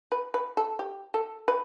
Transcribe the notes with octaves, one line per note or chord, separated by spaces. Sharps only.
B4
B4
A4
G4
A4
B4